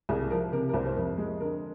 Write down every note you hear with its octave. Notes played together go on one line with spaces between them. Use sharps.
C2 G#4
F3 A#4
C3 A#4
A#4
C2 C5
C5
F2 A#4
G#3
D3 A#4